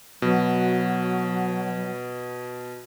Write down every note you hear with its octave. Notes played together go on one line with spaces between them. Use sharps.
B2 F#3